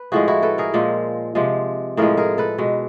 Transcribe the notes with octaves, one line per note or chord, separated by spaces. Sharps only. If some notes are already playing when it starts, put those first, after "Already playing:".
Already playing: B4
A2 F3 G#3 F#4 G#4
E4 F#4
A4 B4
G#4 A#4
A#2 F3 G#3
C3 F3 G#3
A2 F3 G#3 G#4 A#4
G#4 A#4
A4 B4
B2 G#3